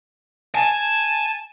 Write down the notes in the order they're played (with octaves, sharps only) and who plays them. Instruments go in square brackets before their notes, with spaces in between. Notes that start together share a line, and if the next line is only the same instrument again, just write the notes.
[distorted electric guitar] G#5 [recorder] A5